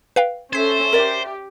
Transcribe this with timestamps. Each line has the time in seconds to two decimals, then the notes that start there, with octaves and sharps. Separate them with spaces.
0.16 B4 F5 G5
0.53 C#4 A4 C5 E5 G#6 B6
0.93 G4 A#4 D5 E5